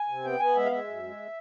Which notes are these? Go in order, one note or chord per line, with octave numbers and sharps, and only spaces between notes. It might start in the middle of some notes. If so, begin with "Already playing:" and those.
Already playing: G#5
C3
B3 G5
B3 G#5
G#3 E5
F5
G#3 E5
F#2
G#3